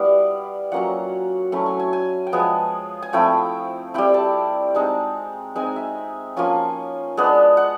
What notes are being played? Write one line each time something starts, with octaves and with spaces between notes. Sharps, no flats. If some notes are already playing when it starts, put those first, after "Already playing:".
Already playing: G3 B3 E4 F5
F#3 A#3 C#4 F4 F#5
F#3 A3 C#4 E4
G#5
G#5
G#5
G5
F3 G#3 B3 G#5
G#5
F3 A3 C4 E4 G5
G3 C4 E4 G5
A5
G#3 C4 D#4 A5
G#3 C4 D#4 G#5
E5
F3 A#3 C#4 F4 G#5
G#3 B3 D4
F#5